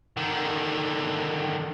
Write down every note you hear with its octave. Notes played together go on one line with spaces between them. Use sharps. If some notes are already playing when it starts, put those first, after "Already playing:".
D3 D#3